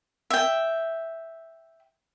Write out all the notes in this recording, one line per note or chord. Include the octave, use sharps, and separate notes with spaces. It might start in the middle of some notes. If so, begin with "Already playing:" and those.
E5 G5